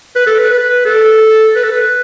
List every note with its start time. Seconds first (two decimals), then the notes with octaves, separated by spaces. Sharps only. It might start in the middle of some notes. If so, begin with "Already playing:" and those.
0.16 B4
0.26 A4
0.39 B4
0.50 B4
0.85 A4
1.55 B4
1.64 A4
1.72 B4